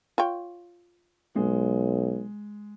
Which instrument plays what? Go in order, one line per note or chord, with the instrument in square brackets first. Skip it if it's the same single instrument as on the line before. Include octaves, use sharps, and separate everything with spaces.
[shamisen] F4 C#5 G5
[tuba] B1 [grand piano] G#3